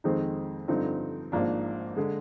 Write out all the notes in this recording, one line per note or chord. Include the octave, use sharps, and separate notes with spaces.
F2 D#3 G#3 C4 D#4
G2 D3 F3 C4 D#4
G#1 G#2 F3 A#3 D4
D3 G#3